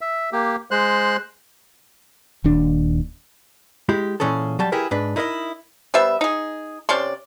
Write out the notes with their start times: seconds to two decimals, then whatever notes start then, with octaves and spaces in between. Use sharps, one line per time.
0.01 E5
0.32 A#3 G4
0.71 G#3 C5 F#6
2.44 D#1 D#2 D4
3.89 G#3 E4 G4
4.20 A#2 E3 C#4 G#4 A4
4.59 F#3 G3 A5
4.72 E4 G4 G#4 A#4 B4
4.91 G#2 D4 B4
5.16 D#4 E4 A#4 B4 D#5
5.94 G3 B3 C5 E5
6.21 D#4 G#4
6.89 C3 C#4 D5 C6